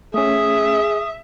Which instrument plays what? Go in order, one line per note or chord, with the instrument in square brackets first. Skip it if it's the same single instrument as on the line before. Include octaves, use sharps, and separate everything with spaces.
[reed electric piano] A3 C#4 [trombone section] G#4 [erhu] E5 [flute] D#6